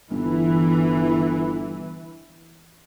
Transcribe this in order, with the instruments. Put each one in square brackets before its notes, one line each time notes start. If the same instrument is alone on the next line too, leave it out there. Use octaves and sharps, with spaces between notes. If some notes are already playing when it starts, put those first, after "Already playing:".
[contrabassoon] G1 [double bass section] E3